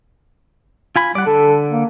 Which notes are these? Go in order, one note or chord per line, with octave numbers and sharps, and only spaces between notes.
F4 G#5 B5
G3 D5 F#5
D3 A4
A#3